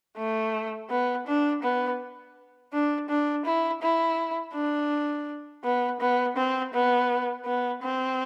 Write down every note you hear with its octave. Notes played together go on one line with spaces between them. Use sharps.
A3
B3
D4
B3
D4
D4
E4
E4
D4
B3
B3
C4
B3
B3
C4